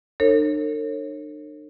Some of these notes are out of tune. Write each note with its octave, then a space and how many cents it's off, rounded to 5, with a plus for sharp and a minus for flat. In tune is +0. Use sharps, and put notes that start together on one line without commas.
D4 +45 A4 +45 C#5 -35